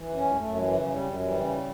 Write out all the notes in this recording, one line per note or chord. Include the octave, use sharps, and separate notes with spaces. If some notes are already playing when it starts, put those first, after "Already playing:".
Already playing: E3
F#2
C#4
F#2 G#3
F#2 A3
E3 G3
F#3
C#3 F3
F#3
F#2 G3
F#2
E3 G3
C#3